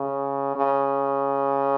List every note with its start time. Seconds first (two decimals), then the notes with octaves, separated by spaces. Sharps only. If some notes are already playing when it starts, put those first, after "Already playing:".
Already playing: C#3
0.56 C#3